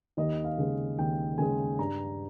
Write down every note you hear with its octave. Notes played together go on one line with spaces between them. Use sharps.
D#2 D#5
F5
C#3 G#3
D#2 G5
C#3 G#3 G#5
G2 A#5